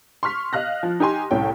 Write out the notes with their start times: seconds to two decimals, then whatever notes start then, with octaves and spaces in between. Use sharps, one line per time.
0.23 C6 C#6 F6 B6
0.53 D#5 F5 F6 F#6 A#6
0.83 F3
1.00 D#4 G4 G#5 C6
1.31 C2 A2 C#4 G5